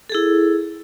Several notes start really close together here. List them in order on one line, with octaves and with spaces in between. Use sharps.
A4 G#4 E4